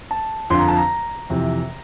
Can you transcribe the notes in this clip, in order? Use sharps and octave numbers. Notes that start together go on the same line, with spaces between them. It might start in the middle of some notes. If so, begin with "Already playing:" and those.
A5
F2 D3 F3 C6
A#5
A5
A#5
F2 C3 E3